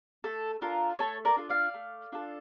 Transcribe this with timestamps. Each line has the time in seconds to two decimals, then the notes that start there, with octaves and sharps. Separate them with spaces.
0.24 A3 A4
0.61 D4 F4 A4 A#4
0.99 A3 A4 C#5
1.25 A#4 D5
1.37 D4 F4 A4
1.49 D5 F5
1.74 A3
2.12 D4 F4 A4